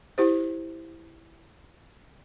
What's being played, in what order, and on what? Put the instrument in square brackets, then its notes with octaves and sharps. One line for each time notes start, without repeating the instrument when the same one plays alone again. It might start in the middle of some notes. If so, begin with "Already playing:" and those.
[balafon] E4 G4 C5